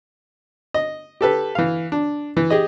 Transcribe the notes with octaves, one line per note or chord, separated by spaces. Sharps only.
D#5
G4 A4 B4
E3 F5
D4
E3
G4 G#4 D#5